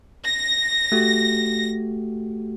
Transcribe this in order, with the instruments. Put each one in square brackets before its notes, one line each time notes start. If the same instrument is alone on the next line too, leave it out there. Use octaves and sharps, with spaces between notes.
[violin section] A#6
[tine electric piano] A3 F#4 G4